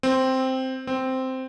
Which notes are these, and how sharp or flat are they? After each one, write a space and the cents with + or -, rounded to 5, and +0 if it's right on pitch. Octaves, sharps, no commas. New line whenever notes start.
C4 +0
C4 -5